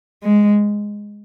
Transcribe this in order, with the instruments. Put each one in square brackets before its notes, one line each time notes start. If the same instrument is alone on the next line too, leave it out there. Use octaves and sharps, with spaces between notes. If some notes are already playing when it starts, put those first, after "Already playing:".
[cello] G#3